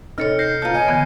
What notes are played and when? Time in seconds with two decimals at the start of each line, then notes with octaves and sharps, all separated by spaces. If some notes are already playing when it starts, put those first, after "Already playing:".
0.18 C3 C4 D#4 A4 C#5 F6 C#7
0.39 G6 A#6 C7
0.62 C#3 B3 F4 A5 A#5 F6 G6
0.74 C#5 D#5 G#5
0.88 D3 E3 B3